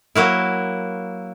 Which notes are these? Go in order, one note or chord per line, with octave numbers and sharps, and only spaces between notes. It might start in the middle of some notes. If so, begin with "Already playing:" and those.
F#3 A#3 E4